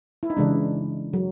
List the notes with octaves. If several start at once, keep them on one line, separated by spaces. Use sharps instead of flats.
E4
D#4
C#3 E3 G#3 D4
F#3